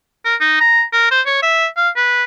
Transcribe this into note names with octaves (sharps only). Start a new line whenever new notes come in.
A#4
D#4
A#5
A#4
C5
C#5
E5
F5
B4